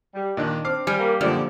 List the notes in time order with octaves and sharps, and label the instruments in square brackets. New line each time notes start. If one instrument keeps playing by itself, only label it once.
[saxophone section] G3
[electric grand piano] A#2 D#3 [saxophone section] D4 [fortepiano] D#5 F#6
[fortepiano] C4 [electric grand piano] D6 F6 C7
[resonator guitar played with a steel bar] G3 [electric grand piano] G#5
[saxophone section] A#3
[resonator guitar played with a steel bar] F#2 [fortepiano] A#2 F3 G3 [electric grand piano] D3 G4 [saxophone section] D5